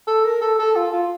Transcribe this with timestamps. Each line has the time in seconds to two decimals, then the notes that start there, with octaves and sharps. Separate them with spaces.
0.07 A4
0.24 A#4
0.41 A4
0.59 A4
0.76 F4
0.93 F4